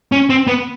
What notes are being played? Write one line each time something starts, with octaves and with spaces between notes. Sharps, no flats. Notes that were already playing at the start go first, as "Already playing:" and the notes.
C#4
C4
B3